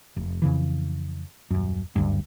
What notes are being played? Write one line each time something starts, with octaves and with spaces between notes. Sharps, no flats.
F1
F2 C#3 E3
D#1 F#2
F#1 D2 G2